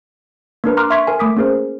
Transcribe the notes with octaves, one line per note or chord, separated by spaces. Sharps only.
A#3 D4 A#4 B4
A#5 C6 D6 F6 F#6
E5 C6 C#6 G#6 B6
A#4 G#5
A3 D6 D#6 B6
A#3 C#4 G#4 A#4 C5